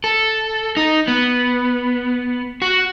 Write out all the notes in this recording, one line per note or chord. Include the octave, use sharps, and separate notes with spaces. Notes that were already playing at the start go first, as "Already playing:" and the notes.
A4
D#4
B3
F#4